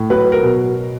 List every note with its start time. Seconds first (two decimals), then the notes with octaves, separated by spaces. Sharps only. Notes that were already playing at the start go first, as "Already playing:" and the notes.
Already playing: A2
0.10 F#3 B4
0.32 A#4
0.43 B2